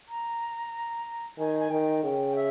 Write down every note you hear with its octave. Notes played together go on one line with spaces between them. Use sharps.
A#5
D#3 G#5
G#5
D#3 G5
C#3 G5
E5